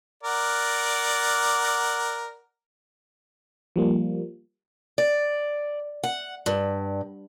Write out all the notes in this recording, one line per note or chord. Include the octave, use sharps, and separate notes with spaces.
A#4 D5 F#5
F3 G3 A#3
D5
F#5
G2